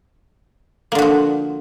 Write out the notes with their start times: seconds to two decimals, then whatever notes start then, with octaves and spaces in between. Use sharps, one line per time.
0.92 A#3
0.95 D3
0.99 F#4
1.02 F3